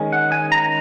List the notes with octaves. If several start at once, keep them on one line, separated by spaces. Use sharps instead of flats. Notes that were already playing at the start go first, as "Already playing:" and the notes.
Already playing: D#3 G#3 C#4
F#5
G#5
A#5